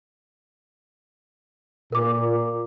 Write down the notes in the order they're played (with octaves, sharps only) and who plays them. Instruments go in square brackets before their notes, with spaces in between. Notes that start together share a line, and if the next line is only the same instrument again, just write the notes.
[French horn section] A#2 [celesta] A#4 D6